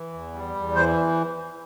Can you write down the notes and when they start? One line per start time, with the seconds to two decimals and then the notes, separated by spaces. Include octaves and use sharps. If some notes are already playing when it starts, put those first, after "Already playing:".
Already playing: E3
0.13 E2
0.34 G3
0.55 E2
0.75 E3 C5